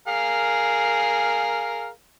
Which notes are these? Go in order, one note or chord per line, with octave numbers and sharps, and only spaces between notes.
G#4 A#4 F5